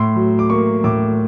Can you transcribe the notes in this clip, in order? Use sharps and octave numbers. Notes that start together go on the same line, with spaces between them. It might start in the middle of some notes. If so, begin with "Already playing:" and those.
Already playing: A2 C6
F#3
D6
A#3 C#6
A2 D6